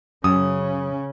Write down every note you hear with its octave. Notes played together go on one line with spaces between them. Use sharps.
F#2 C#3 C#4 D#6